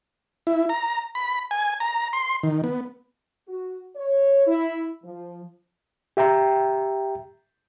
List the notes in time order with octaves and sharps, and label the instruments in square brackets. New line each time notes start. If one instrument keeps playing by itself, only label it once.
[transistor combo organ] E4
A#5
B5
G#5
A#5
C6
D#3
B3
[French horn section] F#4
C#5
E4
F3
[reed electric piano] G4 E5 G5 A#5